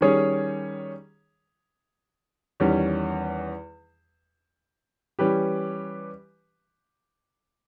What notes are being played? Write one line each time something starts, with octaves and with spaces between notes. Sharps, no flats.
D#3 G3 C#4 G#4 C#5
E2 D#3 G3 C#4
E3 G3 C#4 G4 B4